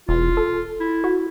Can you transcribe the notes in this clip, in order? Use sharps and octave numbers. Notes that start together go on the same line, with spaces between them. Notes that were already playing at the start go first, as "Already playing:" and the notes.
E1 F4
A4
E4
F#4